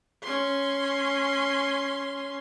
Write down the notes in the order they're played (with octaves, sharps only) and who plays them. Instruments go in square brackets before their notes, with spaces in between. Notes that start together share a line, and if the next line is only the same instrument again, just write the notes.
[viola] C#4 C6